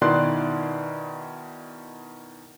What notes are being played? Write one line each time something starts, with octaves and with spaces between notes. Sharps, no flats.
B2 D#3 E4 D5 C6 F#6